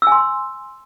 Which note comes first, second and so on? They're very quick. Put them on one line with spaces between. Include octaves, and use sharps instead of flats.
E6 G#5 C6